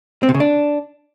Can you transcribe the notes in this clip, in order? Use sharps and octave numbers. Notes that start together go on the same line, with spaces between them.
C4
C3
C#3
D4